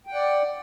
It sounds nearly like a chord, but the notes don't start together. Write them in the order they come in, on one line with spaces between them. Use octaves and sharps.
G5 F#5 D5